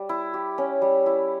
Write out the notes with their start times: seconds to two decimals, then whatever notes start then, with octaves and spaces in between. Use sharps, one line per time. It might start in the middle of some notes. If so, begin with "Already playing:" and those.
Already playing: G3
0.09 E4
0.34 G4
0.58 C#4
0.82 G3
1.06 E4